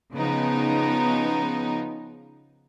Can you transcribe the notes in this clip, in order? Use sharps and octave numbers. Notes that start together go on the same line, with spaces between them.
C#3 F3 B3 D#4